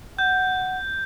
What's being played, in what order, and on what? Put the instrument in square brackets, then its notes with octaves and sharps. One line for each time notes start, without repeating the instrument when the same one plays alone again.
[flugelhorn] F#5 [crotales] G6